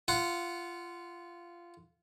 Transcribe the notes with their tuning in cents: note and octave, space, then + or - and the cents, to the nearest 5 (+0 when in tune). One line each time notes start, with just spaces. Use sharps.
F4 -15 F#5 +0